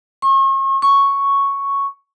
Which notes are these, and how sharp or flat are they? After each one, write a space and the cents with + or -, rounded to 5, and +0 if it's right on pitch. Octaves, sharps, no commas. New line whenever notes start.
C#6 -40
C#6 +0